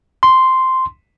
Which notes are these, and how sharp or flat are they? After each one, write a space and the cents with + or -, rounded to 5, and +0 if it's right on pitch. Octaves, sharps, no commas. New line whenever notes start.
C6 -5